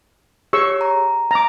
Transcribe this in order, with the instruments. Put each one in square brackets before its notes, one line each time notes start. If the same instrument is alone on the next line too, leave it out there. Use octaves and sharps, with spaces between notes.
[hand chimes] G4 G#4 C#5 [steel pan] C#6 E6
[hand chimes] A#5
[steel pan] A#5 D6